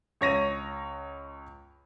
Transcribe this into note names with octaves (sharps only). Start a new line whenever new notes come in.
C#2 C#5 A#6 D#7